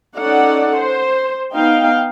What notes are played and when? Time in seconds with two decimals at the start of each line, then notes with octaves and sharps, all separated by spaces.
0.16 C#4 D#4 A4 D5 F#5
0.77 C5
1.54 B3 D#4 F5 G5